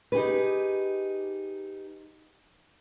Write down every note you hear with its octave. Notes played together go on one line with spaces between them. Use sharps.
D#4 G4 G#4 B4